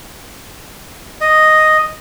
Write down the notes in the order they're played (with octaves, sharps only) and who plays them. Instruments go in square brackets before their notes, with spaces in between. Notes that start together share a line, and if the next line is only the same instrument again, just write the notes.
[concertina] D#5